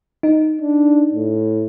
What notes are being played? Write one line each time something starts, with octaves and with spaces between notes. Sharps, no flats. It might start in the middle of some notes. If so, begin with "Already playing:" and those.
D#4
D4
A2